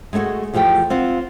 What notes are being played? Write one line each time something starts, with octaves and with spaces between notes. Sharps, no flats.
G#3 A3 D4 F#4 G#4
E2 F3 A3 G4 G5
C4 F4 F#5